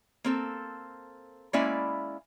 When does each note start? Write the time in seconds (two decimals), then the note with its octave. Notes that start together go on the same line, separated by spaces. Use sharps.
0.24 A#3 C4 A4
1.53 G#3 A#3 C#4 E4 D5 E5